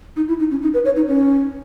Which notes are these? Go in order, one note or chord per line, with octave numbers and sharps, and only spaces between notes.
D#4
E4
D#4
C#4
D#4
B4
C#5
D#4
C#4